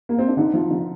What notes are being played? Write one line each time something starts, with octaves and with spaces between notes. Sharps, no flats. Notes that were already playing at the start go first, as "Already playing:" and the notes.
A#3
C4
D4
D3 D#4
F3
D3